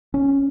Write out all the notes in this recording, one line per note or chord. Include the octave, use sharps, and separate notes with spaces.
C#4